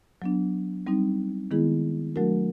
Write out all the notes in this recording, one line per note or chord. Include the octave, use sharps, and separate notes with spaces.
F#3 B3 D4
G3 C4 D#4
D#3 G#3 B3 E4 G#4
F#3 A3 D4 F#4 A#4